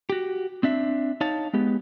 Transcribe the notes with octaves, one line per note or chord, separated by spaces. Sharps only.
F#4 G4
C4 D4 E5
D#4 C#5 F5 A5
G#3 B3 G4